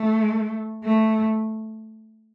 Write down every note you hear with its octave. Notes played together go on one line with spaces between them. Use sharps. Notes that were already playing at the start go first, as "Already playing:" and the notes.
Already playing: A3
A3